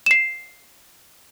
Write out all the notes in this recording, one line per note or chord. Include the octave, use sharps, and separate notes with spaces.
C7 E7